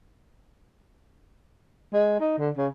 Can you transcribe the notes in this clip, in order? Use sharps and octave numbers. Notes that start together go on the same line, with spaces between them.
G#3
D#4
D3
C#3